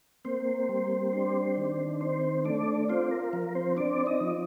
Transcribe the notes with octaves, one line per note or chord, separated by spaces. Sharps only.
A#3 C4 C5
G3
D4
D#3
C4 C5
A3 D4 D5
C4 F4 C5
A#4
F3 A#4
C4 C5
C4 D4 D5
D#4 D#5
F3